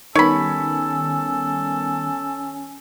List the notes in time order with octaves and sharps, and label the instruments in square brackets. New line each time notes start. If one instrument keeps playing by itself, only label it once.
[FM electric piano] D#3 G3 B3 [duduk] C#4 [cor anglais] A4 [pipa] C#5 B5